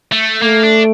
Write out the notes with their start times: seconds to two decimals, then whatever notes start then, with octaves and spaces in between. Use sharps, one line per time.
0.12 A3
0.42 A3 A#3
0.63 D4